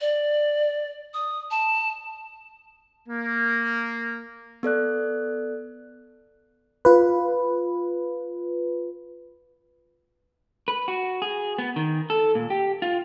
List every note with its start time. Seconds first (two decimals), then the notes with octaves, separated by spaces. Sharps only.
0.01 D5
1.14 D#6
1.51 A5
3.08 A#3
4.63 B3 A4 D5 F#6
6.85 F4 B4
10.68 B4
10.88 F#4
11.22 G#4
11.58 B3
11.76 D#3
12.10 A4
12.35 A#2
12.50 G4
12.82 F4